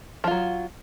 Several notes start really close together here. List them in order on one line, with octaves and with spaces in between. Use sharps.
F3 F4 F#3